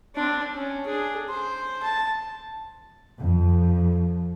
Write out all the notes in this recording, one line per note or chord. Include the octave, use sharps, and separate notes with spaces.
C4 D4
C#4
D4 G#4
C5
A5
F2